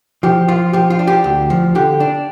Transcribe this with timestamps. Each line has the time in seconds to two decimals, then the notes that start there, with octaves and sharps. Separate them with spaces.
0.23 F3 G4
0.48 F3 F4
0.73 F3 G4
0.90 F4
0.99 D4
1.07 G4
1.24 D2
1.50 F3
1.75 D3 G4
2.00 D4